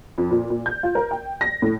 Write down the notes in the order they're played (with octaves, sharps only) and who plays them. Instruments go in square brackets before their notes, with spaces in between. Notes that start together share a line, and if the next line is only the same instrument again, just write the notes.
[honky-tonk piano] F2
A#2
A#2
G6
F4
A#4
G5
A#6
A2